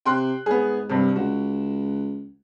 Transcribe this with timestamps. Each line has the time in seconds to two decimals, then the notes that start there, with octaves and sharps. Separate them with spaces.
0.06 C3 G5 C6 F#6
0.46 G#2 B3 G#4
0.89 G2 C3
1.16 C#2 F#4